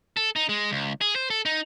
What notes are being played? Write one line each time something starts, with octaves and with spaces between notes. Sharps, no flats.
A4
D#4
G#3
C#2
G#4
C5
A4
D#4